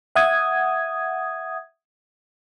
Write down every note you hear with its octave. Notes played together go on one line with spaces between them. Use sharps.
E5 F#5 D#6 G#6